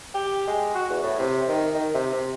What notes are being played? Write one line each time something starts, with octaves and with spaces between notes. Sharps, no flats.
G4
G#3
F#4
E2
A2
C3
D#3
D#3
C3
C3